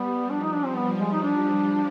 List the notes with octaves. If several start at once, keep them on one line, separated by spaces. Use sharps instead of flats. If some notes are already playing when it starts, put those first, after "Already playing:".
Already playing: G3 B3
F3 D4
D#4
D4
G3 C4
B3
G#3
D#4
D4